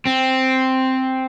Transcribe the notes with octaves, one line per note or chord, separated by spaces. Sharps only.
C4